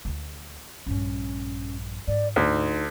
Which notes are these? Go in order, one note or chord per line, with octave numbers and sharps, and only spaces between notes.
D2 D3
A#1 G2 C#4
G#2 D5
D2 D#4